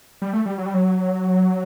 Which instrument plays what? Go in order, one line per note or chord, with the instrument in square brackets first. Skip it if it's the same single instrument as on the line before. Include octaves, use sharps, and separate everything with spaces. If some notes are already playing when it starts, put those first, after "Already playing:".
[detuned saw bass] G3
A3
G3
F#3
G3
F#3